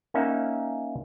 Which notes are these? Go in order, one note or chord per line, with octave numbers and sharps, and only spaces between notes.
A#3 C#4 D#4 E5 F#5